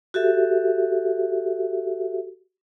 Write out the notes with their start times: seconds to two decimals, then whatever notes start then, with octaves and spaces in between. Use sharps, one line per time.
0.14 F#4 G4 A4 E5